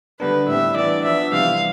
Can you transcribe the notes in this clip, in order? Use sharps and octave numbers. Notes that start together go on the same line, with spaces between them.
D3 G3 B3 D4 B4
A2 G3 C4 E5
E3 B3 D4 D5
F3 B3 D4 E5
C3 E3 G3 F5